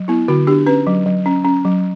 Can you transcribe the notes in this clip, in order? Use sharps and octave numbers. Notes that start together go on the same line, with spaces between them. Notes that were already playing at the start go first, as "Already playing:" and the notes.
Already playing: F#3
B3 E4
D3 F#4
D4 G4
C#4 B4
F#3
F#3
C#4
C#4
F#3